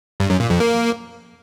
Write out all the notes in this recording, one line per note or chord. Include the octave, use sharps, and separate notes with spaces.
G2
F#2
A#2
F2
A#3